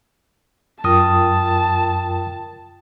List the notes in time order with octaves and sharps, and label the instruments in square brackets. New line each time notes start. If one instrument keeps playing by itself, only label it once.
[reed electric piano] F#2 D#6 [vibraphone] F4 A#4 G5 [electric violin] A5